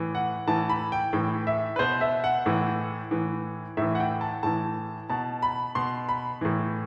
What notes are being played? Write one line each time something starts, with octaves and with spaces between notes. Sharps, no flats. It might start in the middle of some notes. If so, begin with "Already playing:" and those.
Already playing: A2 E3
F#5
A2 E3 A5
B5
G5
A2 E3
E5
B4
B2 C5
E5
F#5
A2 E3
A2 E3
A2 E3 E5
F#5
G5
A5
A2 E3 A5
B2 A5
B5
B2 C6
B5
A2 E3